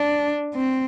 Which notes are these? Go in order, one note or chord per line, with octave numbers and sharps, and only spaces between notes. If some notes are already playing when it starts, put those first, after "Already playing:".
Already playing: D4
C4